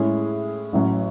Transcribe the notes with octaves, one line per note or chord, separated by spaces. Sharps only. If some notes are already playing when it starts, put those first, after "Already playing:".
Already playing: A2 G#3 C#4 E4 G#4
A1 A2 F#3 C#4